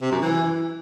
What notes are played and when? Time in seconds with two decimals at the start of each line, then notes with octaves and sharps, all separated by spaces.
0.01 C3
0.11 F#2
0.21 E3